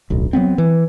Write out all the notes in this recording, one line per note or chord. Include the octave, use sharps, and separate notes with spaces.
D1 B1
F#3 G3 B3 C4
E3